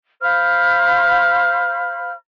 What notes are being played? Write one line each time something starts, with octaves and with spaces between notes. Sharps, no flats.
C5 F5 B5 F6